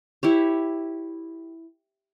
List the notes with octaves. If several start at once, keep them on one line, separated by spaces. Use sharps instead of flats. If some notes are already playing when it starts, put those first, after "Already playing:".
E4 G4 C#5